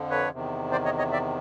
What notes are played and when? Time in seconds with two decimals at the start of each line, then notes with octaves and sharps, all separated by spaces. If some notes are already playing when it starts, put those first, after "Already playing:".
Already playing: F2 D3 F3
0.10 B4 C#5
0.31 E2 C3 D#3
0.72 C5 D5
0.85 C#5 D#5
0.98 C#5 D#5
1.12 D5 E5